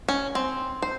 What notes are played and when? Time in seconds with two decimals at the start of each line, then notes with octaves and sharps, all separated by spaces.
0.08 C#4
0.35 C4
0.82 C5